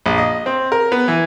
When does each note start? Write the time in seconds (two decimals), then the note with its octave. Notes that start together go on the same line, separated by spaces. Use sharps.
0.06 A#1
0.18 D#5
0.46 C4
0.72 A#4
0.92 B3
1.08 E3